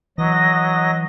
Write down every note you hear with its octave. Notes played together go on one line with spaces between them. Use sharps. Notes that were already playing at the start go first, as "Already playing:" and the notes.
E3 F#3 D#5 A#6